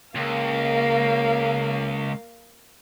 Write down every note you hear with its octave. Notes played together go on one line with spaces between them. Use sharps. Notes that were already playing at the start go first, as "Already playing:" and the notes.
C#2 A#3 F5